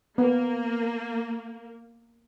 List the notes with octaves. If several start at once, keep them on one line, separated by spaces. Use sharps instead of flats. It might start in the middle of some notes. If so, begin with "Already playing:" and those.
A#3 B3